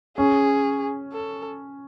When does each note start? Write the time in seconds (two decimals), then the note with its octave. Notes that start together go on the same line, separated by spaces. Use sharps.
0.17 C#4 G#4
1.12 A4